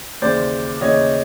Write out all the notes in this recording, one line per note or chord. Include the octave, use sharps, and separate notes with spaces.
D#2 C#3 E3 C5 D5
D#2 C#3 E3 C#5 D#5